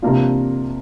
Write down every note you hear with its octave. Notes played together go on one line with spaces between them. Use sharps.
C3 A#3 D4 F4